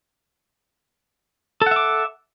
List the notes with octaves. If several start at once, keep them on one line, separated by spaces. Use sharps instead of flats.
A4 E5 F#5 D6